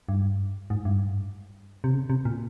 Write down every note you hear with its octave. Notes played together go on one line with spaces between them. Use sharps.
G2
G#2
G2
C3
C#3
C3
A#2